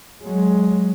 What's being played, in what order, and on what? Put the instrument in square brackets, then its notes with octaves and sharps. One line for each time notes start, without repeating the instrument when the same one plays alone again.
[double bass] F#3 G#3